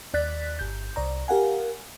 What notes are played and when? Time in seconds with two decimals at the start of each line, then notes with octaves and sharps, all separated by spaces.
0.14 D#2 D5 F#6 A6 B6
0.59 G1 G6
0.96 C2 D5 A#5
1.28 G4 A#4 F5 F#5 G#5